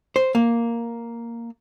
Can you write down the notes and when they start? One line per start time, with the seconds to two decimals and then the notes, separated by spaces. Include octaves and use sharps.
0.16 C5
0.35 A#3